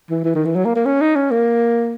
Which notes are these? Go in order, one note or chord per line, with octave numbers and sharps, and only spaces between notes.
E3
E3
D#3
E3
F#3
A#3
A#3
C#4
D#4
C#4
A#3